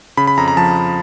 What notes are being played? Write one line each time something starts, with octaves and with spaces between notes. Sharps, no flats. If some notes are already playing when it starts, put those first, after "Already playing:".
C#3 B5
B5
F2 A#5
A#5
F3 A5